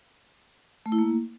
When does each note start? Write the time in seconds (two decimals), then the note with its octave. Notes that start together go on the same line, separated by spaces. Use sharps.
0.86 A3
0.92 E4
0.99 A#3